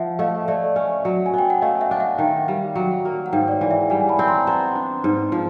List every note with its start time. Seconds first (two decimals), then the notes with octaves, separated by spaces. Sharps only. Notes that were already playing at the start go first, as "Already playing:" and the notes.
Already playing: F3 E5 F#5
0.19 A3 D#5 F5
0.48 A3 D5 E5
0.76 C#4
1.05 F#3
1.26 G#5
1.33 B3 G5
1.50 F#5
1.62 A3 D#5 F5
1.81 E5 F#5
1.91 D4
2.00 E5 F#5
2.18 D#3 F5 G5
2.48 G3
2.75 F#3
3.05 A#3
3.26 F#5
3.33 G#2 F5 G5
3.48 D5
3.51 C#5
3.61 E3
3.71 E5 F#5
3.90 G3 F#5 G#5
4.09 A5 B5
4.19 C4
4.28 A#5 C6
4.47 B3 A#5 C6
4.75 D4
5.04 G#2
5.32 F3